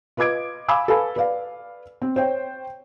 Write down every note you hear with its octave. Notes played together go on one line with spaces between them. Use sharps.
F4 B4 D#5 D6 G#6 D7
F5 G#5 B5 D6 E6
A4 B4 F5 G#5 B5
B4 D5 F5
C4
C5 C#5 G5